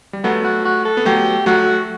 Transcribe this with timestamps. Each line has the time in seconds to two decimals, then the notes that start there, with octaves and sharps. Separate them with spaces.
0.13 G3
0.24 F#3 A3 B3
0.44 F#4
0.65 F#4
0.85 A4
0.97 B3
1.05 F#3 A3 G4
1.46 F#3 A3 F#4